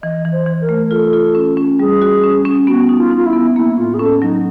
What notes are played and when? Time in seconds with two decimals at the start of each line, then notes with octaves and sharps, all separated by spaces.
0.03 E3 D#5
0.25 E3
0.32 C5
0.46 E3
0.61 A#4
0.69 A3
0.91 F4 A4
1.13 F4
1.35 C#4
1.57 C#4
1.79 G3 G#4
2.02 F#4
2.23 C#4
2.45 C#4
2.67 B3 F#4
2.89 D#4
2.97 F4
3.11 D#4
3.17 F4
3.26 E4
3.33 B3
3.56 A#3 E4
3.77 A2 F4
3.94 G#4
3.99 C#4 A4
4.22 F#3 D#4